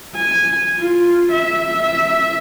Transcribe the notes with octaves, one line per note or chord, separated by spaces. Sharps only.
G#5
F4
E5
E5